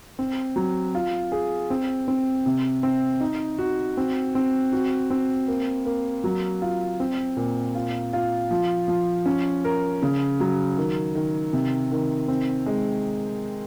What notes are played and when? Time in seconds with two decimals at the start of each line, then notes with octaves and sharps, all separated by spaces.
0.19 C4
0.56 F#3
0.95 F4
1.32 G#4
1.70 C4
2.08 C4
2.46 C3
2.83 C4
3.20 D#4
3.59 F#4
3.97 C4
4.35 C4
4.73 F#4
5.10 C4
5.47 A#3
5.85 A#3
6.24 F#3
6.62 F4
7.00 C4
7.37 A#2
7.75 F4
8.13 F4
8.51 F3
8.88 F3
9.26 C#4
9.64 A#4
10.03 C#3
10.40 F#3
10.77 D#3
11.15 D#3
11.53 C3
11.91 D#3
12.28 C4
12.66 G#3